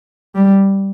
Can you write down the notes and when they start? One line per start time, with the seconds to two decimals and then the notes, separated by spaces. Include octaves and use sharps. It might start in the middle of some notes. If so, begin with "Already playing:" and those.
0.35 G3